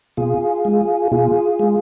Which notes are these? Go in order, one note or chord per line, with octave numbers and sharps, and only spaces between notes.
B2 F4 G#4
G#3
B2 F4 G#4
G#3